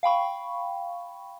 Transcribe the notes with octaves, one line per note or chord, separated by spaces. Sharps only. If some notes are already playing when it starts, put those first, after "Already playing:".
F5 G5 B5 C#6